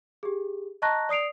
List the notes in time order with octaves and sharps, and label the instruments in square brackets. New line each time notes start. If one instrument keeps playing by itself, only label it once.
[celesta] G4 G#4
D#5 A5 A#5 C#6 F#6 A#6
D5 D#6 C7 D7 F7